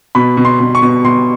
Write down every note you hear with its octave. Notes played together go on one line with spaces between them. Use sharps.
B2 B5
B2
C6
B2
C#6
B2
B2 C6